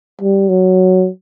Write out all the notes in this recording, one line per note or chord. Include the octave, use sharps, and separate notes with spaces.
G3
F#3